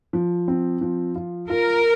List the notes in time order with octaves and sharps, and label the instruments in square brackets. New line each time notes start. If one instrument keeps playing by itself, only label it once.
[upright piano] F3
C4
F3
F4
[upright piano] F4 [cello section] A#4